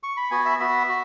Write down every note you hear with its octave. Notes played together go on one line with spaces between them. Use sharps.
C#6
B5
B3 F#4 G#5
E5
B3 F#4 E5
F#4